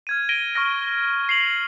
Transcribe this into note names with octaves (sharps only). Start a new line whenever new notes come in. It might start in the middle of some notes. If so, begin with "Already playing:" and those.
F6 G#6 D#7
A#6 D7 D#7 G7
C#6 F6 A#6 D#7
C7 F7 F#7